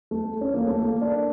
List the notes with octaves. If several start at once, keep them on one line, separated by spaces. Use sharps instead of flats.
A3
C#4
A#3
A3
A#3
D4